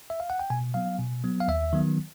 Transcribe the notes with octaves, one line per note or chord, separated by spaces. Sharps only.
E5
F5
F#5
G5
B2 G#5
F#3 B3 F5
B2
F#3 B3
F5
D#2 E5
D#3 F#3 B3